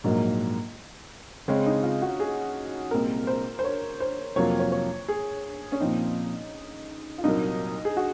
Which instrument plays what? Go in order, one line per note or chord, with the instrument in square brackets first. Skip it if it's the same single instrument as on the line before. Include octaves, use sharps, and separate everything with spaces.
[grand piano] A#1 G#2 F#3 A#3
[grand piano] C#3 G#3 C4 [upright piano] C#4
[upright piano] D#4
F4
F#4
G#4
[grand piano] C2 A#2 G#3 C4 [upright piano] A#4
[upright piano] C5
C5
C#5
C5
[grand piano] F2 C3 F#3 A#3 F4 [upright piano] C#5
[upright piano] C#5
C#5
G#4
C#4
[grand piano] A#2 F3 C4 [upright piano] D#4
[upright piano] F4
[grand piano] C2 A#2 F#3 A#3 [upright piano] D#4
[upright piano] G#4
F#4